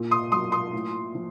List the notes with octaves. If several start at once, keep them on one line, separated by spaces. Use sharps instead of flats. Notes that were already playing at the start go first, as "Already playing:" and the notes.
Already playing: A#2
C6 D#6
F#3 C6 D#6
C6 D#6
A2
F3